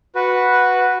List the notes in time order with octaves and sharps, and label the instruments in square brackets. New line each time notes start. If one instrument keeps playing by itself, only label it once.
[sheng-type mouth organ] F#4 B4